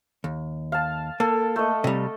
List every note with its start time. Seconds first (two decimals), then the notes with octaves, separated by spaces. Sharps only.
0.24 D#2
0.72 F5 A5
1.20 A#3 A4
1.56 A3 D#5
1.84 C3 G3